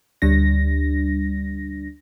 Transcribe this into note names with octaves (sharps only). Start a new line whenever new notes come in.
D2 G3 D4 A#6